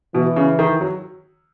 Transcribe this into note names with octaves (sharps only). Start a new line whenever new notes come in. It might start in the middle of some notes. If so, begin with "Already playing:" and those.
B2 E3
C#3
D#3
F#3